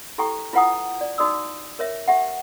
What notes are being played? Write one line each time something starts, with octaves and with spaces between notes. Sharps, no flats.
E4 G4 A4 G5 A#5 C#6
E4 F4 B4 F#5 A#5 D#6
D5
D#4 F#4 D5 D#6 E6
A#4 C#5 E5
G4 E5 F#5